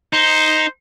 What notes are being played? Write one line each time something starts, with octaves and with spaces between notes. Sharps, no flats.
D#4 C5